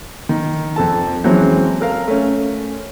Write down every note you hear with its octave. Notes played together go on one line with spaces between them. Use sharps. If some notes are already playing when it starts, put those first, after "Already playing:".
D#3
F2 A4 A5
E3 F#3 G#3 C4 C#4
A4 A#4 F5
A3 C#4